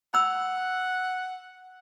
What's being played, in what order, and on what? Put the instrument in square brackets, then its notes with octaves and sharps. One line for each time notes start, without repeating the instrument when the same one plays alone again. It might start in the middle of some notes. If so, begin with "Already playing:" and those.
[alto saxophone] F#5 [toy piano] B5 E6